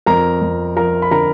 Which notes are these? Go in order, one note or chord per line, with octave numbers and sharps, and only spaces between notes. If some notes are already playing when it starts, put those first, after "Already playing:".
F2 A#4 A#5
F2
F3 A#4 A#5
B5
D3 A#4 A#5